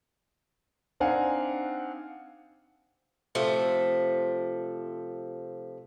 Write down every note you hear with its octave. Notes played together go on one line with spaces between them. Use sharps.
C4 D4 D#4 F5 F#5 G#5
C3 F3 A3